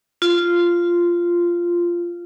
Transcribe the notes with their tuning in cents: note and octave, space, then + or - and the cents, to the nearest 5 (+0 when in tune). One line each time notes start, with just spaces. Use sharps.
F4 -10